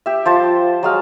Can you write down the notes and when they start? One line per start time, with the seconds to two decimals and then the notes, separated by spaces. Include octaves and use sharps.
0.06 G4 E5
0.26 F3 C5 A5
0.83 F#3 G#3 F5